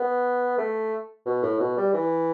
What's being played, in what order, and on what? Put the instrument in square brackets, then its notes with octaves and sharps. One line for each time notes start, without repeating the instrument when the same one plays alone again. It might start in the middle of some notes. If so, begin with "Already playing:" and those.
Already playing: [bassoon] B3
A3
B2
A2
B2
G3
E3